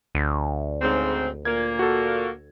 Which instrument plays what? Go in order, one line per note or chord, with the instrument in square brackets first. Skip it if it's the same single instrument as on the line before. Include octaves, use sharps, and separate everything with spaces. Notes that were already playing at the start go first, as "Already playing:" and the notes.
[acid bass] D2
[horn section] G#2 C#3 C4
[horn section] A#2 A#3 [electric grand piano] G#6
[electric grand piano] F#4 A4